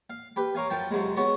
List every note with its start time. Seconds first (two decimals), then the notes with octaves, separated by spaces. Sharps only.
0.10 F5
0.36 G4 B4
0.55 A#4 C#5 F5 G#5
0.70 F#2 F3 G5 A5
0.91 F2 C3 F#3 G#3
1.17 G#3 B3 F#4 C#5